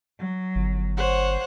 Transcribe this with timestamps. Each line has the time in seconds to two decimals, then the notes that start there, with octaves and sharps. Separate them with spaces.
0.20 F#3
0.55 G1
0.97 C5 C#5 F#5